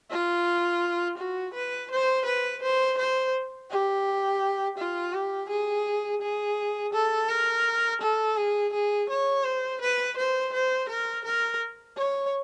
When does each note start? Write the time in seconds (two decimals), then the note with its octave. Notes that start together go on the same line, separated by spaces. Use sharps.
0.10 F4
1.18 F#4
1.54 B4
1.91 C5
2.25 B4
2.62 C5
2.98 C5
3.70 G4
4.78 F4
5.13 G4
5.49 G#4
6.21 G#4
6.93 A4
7.29 A#4
8.01 A4
8.36 G#4
8.73 G#4
9.09 C#5
9.44 C5
9.81 B4
10.17 C5
10.53 C5
10.89 A#4
11.24 A#4
11.97 C#5